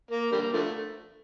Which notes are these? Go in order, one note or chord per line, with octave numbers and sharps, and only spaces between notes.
A#3
D3 G3 A#3
D3 F3 A3